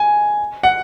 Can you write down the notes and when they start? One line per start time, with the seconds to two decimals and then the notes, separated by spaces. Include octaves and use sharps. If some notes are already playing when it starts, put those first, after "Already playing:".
Already playing: G#5
0.63 F#5